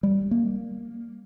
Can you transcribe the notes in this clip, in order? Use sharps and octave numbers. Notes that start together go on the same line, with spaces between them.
G3
A#3